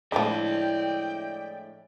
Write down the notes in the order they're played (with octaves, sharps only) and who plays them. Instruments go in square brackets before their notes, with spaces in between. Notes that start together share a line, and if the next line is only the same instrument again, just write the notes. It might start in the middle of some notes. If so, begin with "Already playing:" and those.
[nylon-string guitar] A2 G#3 D4 [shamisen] D3 F3 [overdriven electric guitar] D5 E5 [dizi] G5